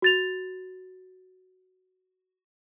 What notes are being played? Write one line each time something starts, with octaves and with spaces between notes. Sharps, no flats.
F#4 A6 F7